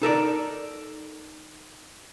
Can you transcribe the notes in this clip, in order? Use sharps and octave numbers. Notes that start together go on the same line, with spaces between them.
D#4 A4 A#4 D5